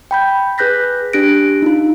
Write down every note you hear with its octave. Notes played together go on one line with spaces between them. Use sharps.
G5 B5 G6
G#4 B4 F#6 G6 A#6 B6
D4 G4 F#6 A#6 D7
D#4 F4